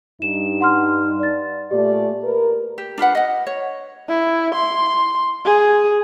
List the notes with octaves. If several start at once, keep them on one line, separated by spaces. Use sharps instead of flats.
G2 D#4 E7
F#5 C6 F6
D5 A6
A#2 A3 G4 D5
A#4 B4
G4
D4 F4 B4 F#5
D#5 F#5
C#5
E4
C6
G#4